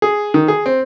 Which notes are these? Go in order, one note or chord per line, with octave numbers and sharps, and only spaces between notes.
G#4
D#3
G#4
C4